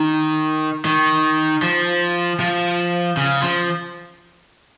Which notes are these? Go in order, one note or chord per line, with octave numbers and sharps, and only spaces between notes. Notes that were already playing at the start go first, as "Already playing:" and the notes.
Already playing: D#3
D#3
F3
F3
C#3
F3